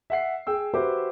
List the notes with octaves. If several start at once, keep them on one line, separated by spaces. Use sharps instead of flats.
E5 F#5 C7
G#4 G5 E6
F#4 G4 B4 C5 E5 D6